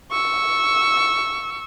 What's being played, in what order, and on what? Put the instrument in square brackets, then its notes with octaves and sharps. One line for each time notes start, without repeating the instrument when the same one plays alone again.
[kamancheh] C#6 E6